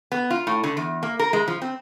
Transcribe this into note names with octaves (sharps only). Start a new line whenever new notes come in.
B3
F4
A2
D3
E2
A#3
A#4
G#3
F3
C4